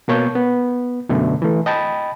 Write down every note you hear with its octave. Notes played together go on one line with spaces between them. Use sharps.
B2 A#3 C#5 A5 C#6 G6
B3
F#2 B2 D3 A3
E3 A3
D#5 G5 A5 B5